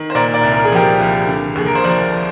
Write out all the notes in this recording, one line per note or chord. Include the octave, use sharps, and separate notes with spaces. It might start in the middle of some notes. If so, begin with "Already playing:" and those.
Already playing: D#3
C5
A#2 A#4 D5
A#4 D5
C2
A#4
G#4
F3 G4 A#4
C2
D3
D#2 G#4
A#4
C5
F3 A#4 D5